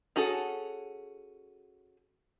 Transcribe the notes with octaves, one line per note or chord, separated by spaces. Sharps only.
C#4 F#4 G#4 A4